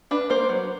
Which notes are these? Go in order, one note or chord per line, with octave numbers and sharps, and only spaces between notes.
D4 B4
A#3 C5
F#3